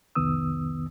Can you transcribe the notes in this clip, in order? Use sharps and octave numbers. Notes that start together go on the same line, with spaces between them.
C2 F2 D#3 B3 D#6 E6